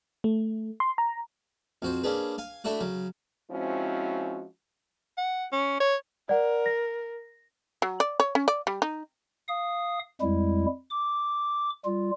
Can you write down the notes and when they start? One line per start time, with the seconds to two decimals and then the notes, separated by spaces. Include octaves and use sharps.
0.24 A3
0.80 C6
0.98 A#5
1.82 F2 F#4 C5
2.03 A#3 C#4 D4 G#4 B4
2.38 F5 G#5
2.64 A3 D4 E4 F#4 F#5
2.80 C#3 F#3
3.50 F3 G#3 C4 C#4 E4 F#4
5.18 F#5
5.52 C#4
5.80 C#5
6.29 A#4 D5 F#5
6.66 A#6
7.82 F#3
8.00 D5
8.20 C#5
8.35 C#4
8.48 D5
8.67 G3
8.82 D#4
9.48 F5 D#6
10.21 F2 G3 G#3 E4
10.90 D6
11.85 G3 F4